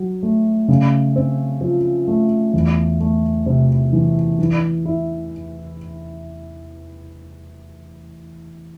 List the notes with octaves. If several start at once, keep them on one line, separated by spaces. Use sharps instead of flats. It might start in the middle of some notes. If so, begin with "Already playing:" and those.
Already playing: F#3
A3
C#3
C4
F3
A3
E2
A3
C3
E3
E3
E4